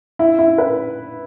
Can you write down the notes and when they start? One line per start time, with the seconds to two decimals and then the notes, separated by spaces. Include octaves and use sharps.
0.19 E4
0.39 E4
0.58 B4